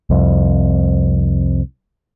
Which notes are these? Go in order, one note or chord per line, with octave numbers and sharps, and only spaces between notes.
C2 F2